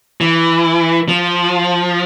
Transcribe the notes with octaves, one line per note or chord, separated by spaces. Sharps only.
E3
F3